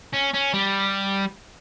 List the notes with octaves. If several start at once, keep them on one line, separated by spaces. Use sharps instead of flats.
C#4
C#4
G3